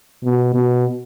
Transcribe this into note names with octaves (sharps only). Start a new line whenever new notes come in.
B2
B2